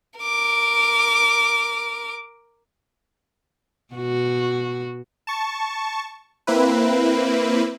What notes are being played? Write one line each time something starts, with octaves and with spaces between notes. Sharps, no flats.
A#4 D6
B2 F#4
A5 C#6
A#3 C4 E4 B4